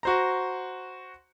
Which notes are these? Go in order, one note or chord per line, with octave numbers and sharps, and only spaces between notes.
F#4 C5 A#5